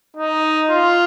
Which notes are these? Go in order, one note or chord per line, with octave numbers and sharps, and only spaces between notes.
D#4
F4